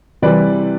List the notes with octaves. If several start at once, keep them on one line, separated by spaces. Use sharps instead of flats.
C3 E3 G3 B4 D5